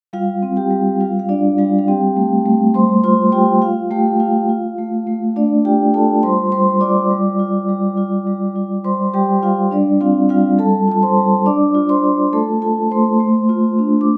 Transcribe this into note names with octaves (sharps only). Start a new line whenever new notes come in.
G3 F4 F5
C4
G4 G5
G3
G3 F4 F5
F5
D4 F4 D5
G3 F4 F5
F5
C4 G4 G5
A3
A3
G3 C5 C6
F4 C5 C6
F4 G4 G5
F4 F5
A3 G4 G5
F4 F5
F4
A3
A3
A3 D4 D5
F4 G4 G5
F4 A4 A5
G3 C5 C6
G3 C5 C6
F4 D5 D6
G3
F4
G3
F4
G3
F4
G3 C5 C6
G3 G4 G5
G3 F4 F5
G3 D4 D5
C4 F4 F5
G3 F4 F5
G3 A4 A5
F4 A5
C5 C6
G3
D4 D5 D6
F4
C5 C6
F4
A3 A4 A5
F4 A4 A5
A3 C5 C6
A3
F4
D4
D6